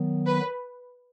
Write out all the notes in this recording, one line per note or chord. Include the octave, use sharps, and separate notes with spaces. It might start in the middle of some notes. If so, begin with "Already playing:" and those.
Already playing: D#3 F#3 B3
B4